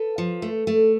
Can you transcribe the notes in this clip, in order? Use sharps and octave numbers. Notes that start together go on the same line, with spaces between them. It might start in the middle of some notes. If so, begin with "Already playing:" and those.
Already playing: A4 B4
F3
A3
A3